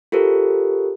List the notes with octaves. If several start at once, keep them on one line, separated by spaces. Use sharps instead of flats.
F4 G4 A4 A#4 C5